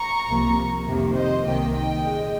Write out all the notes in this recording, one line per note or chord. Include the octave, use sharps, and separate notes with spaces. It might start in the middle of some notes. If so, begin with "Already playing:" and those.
Already playing: A#5 C#6
C2 C3 F3 A#3
F2 C3 D#3 A#3
C5 D#5
C2 C3 D#3 A#3 D#5 G5
D#5 G5
A#2 G#3